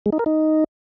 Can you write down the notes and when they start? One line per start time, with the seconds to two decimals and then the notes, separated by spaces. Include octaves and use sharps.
0.06 G#3
0.12 D#4
0.19 A#4
0.26 D#4